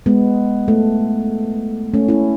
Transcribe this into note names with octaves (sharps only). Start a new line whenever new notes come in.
G#3 B3
A3
A3 C#4
C#4 E4